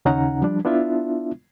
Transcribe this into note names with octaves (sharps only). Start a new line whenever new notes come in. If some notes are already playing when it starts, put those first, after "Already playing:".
D#2 C#3 C#4 D#4 F#5 A#5
F3 G3 D4
B3 D4 E4 F4 E5